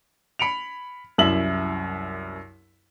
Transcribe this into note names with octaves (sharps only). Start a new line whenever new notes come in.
B5 C#7 D7 F7
C2 F#2 E4 E5 F#7